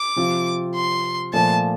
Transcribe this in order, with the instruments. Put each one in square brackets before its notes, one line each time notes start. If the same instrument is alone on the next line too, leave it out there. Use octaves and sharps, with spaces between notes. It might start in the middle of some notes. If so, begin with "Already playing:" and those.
Already playing: [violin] D6
[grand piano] C3 F3 C4 F4
[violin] C6
[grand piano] A#2 F3 A3 [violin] A5